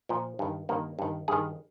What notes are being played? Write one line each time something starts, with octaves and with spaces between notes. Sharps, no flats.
A#2 F3
G2 D#3
G2 D#3 A#3
G2 D#3
G2 D#3 G#4